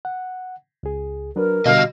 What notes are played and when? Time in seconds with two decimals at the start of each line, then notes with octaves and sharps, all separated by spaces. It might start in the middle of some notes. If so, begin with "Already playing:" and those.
0.05 F#5
0.83 C#2 G#4
1.36 F#3 D4 A#4 B4
1.66 B2 D3 G3 F#4 D#5 F5